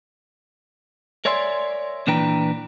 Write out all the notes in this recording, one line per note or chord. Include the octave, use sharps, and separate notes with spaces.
A#4 C#5 D5 E5 G#5 C6
A#2 E3 D4 B4 G5 A#5